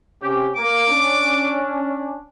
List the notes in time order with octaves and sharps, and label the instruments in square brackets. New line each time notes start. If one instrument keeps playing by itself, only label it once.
[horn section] C3 C#4 G4
[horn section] A#3 [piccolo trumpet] D6
[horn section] C#4 D4